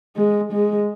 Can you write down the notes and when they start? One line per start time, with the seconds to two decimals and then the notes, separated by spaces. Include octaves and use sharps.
0.16 G#3
0.52 G#3